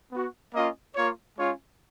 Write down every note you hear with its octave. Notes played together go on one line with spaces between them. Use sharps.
B3 F#4
A#3 C#4 F4 D#5
A#3 F4 C#5
G#3 C#4 F4 C#5